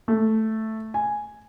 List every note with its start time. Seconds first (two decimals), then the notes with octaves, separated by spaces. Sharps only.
0.08 A3
0.94 G#5